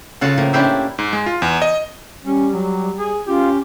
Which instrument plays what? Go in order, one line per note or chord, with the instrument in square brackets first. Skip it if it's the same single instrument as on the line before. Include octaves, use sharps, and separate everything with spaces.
[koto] C#3 F4 F#4 A4 A5
A2 F3 A#3
C#4 D4 E4 G4 C5 E5
[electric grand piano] G#2
G#3
F4
E2
D#5
[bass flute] G3 [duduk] C#4
[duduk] F#3
G#4
[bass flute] C#4 [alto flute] F4 [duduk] G4